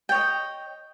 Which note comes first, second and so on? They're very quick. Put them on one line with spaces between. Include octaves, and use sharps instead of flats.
G5 C#5 D#5